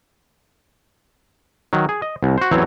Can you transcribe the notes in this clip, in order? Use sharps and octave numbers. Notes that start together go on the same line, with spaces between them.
D#3 F#3
G#4
D#5
C2
F#4 C5
A1 E2 E3 F#3 C4 C#5